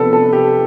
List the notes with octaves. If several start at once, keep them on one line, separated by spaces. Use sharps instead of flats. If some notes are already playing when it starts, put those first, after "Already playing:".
Already playing: C3 F3 B3 D4 A4 B4
A4
G4